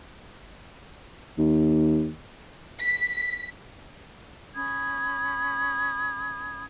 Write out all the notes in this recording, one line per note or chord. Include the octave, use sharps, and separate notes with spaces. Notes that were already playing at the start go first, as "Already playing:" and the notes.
D#2
B6
C#4 B5 D#6 G#6